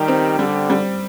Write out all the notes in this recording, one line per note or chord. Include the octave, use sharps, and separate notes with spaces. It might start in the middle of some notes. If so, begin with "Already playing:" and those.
Already playing: D#3 G3 G4
C4
D3 G3
G3